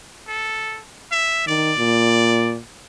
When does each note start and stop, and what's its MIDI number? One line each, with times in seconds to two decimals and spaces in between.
0.28 0.81 69
1.12 1.47 76
1.47 1.72 51
1.47 2.55 74
1.78 2.59 46